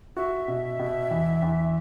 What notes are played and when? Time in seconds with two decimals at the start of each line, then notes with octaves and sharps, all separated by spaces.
0.17 F#4 E5
0.48 B2
0.79 B2
1.11 E2
1.42 E2